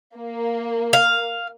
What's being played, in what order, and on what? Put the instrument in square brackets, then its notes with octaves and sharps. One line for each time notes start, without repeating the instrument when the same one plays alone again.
[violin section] A#3
[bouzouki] F5